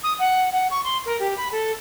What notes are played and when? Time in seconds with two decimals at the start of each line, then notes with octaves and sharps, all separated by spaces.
0.03 D#6
0.19 F#5
0.53 F#5
0.71 C#6
0.84 C6
1.06 A#4
1.20 G4
1.37 B5
1.52 A4